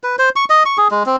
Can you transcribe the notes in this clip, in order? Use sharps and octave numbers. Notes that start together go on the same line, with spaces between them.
B4
C5
C#6
D#5
C#6
G#4
G#3
C4